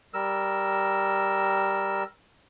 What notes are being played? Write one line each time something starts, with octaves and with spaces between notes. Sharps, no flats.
G3 A#4 E6